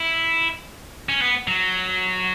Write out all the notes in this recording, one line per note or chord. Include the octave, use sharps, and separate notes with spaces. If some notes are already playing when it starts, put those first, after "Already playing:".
Already playing: E4
C#4
B3
F#3